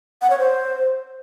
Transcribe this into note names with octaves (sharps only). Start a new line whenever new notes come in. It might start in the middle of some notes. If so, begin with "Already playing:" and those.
F#5
C#5
C5